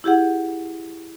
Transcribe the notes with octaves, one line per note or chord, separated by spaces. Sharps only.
E4 G4 G#4 F#5